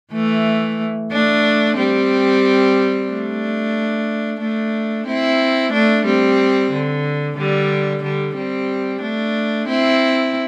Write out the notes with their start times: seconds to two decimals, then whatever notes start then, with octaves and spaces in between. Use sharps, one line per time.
0.13 E3 A3
1.11 A3 D4
1.77 G3 C4
3.10 A3 D4
4.41 A3 D4
5.07 C4 E4
5.73 A3 D4
6.06 G3 C4
6.72 D3
7.37 D3 G3
8.03 D3 G3
8.36 G3 C4
9.02 A3 D4
9.67 C4 E4